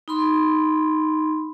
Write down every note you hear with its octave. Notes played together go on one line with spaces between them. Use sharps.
D#4 B5 C6